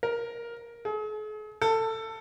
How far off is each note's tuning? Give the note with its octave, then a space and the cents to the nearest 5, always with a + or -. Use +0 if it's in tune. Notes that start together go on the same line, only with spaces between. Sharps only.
A#4 +10
G#4 +45
A4 +20